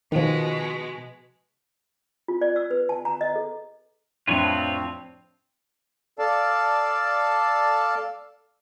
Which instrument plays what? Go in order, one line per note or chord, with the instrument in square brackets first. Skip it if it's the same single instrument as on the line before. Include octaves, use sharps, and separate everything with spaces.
[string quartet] B2 G#3 [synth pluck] D#3 F3
[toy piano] F4
D5
E6
B4
A5
A#5
D#5
A4
[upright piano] F2 A2 [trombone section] C4 [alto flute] D4 [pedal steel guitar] F4 B4 C#5
[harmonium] A4 D5 F5 A5